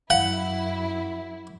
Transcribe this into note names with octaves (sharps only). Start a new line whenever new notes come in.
F#2 E4 F5 F#5